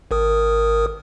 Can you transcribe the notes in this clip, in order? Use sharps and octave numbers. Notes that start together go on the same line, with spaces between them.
G#1 A#4 D#6